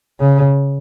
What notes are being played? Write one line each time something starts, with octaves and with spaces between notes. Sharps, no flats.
C#3